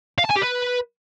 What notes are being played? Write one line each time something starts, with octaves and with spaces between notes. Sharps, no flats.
F5
A5
G#5
G4
B4